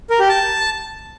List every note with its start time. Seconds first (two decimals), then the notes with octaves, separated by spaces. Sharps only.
0.10 A#4
0.20 G4
0.29 A5